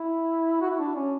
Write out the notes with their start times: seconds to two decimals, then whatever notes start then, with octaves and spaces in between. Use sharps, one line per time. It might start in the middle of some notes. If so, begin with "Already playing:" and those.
Already playing: E4
0.61 F#4
0.70 E4
0.79 D4
0.96 C#4